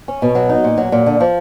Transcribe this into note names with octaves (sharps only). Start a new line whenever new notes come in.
C#4
B2
F#3
D#4
A#2
F#3
A#2
D3
F3